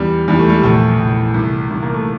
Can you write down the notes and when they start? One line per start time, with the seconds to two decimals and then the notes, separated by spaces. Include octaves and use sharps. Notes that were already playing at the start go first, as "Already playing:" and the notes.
Already playing: E2 G3
0.28 E2 G3
0.39 A3
0.49 G3
0.63 A#1 A3
0.99 A#1
1.34 C2
1.70 C2
1.82 A#3
1.94 A3